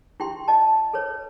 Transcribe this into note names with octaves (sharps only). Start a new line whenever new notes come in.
E4 G4 G5 C6
D#5 A5
A4 B4 C#5